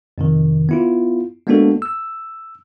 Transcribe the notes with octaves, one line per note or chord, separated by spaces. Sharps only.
F2 C3 D#3
B3 E4 F4
G#3 A#3 B3 D4 F#4 A4
E6